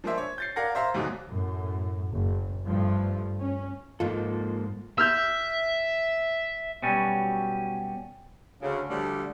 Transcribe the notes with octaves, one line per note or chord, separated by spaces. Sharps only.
F3 G#3 A#3 D4 C5 E5
C#5
G6 A6 C7
A#4 D5 F5 F#5 G#6 A#6
C5 E5 F5 A#5
D2 G#2 B2 D3 F#3
F#2 A2
F#1
G2 F3 A3
C#4
G#2 F3 G#3 A#3 F4 A4
E5 E6 F6 G6
B2 F#3 G3 C#4
D2 C#3
D2 D3 F3 G3 A3